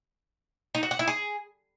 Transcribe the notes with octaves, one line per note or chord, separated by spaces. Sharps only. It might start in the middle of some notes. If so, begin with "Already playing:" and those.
D#4
F#4
F#5
E4
G#4